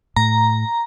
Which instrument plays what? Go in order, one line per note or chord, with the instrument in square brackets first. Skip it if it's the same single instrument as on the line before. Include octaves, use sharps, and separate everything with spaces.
[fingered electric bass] A2 [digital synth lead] A#5